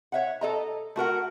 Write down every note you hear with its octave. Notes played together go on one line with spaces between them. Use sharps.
C#5 E5 F#5
A4 D#5 A#5
A3 F#4 A#4 F#5